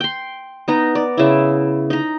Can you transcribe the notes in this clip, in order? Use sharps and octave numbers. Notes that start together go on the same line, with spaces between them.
G5 C6
B3 D#4 A#5
D5
C#3 E4
D#4 A#5